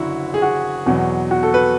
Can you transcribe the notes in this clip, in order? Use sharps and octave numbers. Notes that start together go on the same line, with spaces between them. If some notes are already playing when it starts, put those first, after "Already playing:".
Already playing: F#1 D3 F#3 E4 F#4
G#4
F#4
E2 B2 F#3
F#4
A4
B4